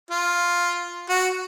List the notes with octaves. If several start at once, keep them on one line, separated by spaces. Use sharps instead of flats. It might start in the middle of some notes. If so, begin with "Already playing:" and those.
F4
F#4